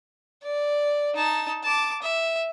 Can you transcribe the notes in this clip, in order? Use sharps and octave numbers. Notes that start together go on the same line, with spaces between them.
D5
D#4 A5
A5 D6
E5